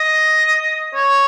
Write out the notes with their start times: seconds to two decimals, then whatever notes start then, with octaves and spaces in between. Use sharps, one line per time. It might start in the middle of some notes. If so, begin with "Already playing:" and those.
Already playing: D#5
0.95 C#5